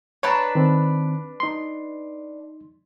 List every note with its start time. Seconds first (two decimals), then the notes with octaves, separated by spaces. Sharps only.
0.23 D4 B4 C#5 A5 A#5
0.55 D#3 C4
1.40 D#4 C6